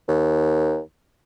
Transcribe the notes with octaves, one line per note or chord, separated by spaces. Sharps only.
D#2